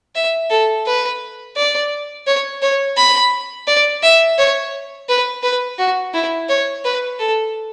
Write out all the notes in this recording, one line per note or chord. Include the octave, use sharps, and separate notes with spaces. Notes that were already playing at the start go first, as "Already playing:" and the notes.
E5
A4
B4
D5
C#5
C#5
B5
D5
E5
C#5
B4
B4
F#4
E4
C#5
B4
A4